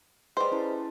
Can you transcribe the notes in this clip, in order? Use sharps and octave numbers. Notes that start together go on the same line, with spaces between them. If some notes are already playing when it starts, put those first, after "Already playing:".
G3 G#4 B4 C5 D#5
C#4 E4 A5